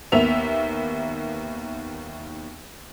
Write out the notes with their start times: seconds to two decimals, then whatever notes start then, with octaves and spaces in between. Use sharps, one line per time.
0.12 D#2 A#3 B3 E5 F7